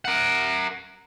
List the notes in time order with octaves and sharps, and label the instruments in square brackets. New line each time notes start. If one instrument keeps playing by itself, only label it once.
[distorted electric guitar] A#4 F#5